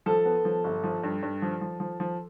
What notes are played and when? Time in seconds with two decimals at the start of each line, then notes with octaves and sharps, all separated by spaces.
0.06 F3 A4
0.25 B3
0.45 F3
0.64 G1
0.84 F3
1.04 G2
1.23 G2
1.42 F3
1.61 F3
1.80 F3
2.00 F3